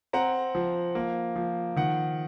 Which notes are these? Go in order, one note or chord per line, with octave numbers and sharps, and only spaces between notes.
C4 F#5 A#5
F3
A#3
F3
D#3 F#5